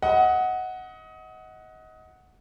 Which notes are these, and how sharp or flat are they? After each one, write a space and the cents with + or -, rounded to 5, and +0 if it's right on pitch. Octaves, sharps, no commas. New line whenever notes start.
D#5 +25 F#5 +0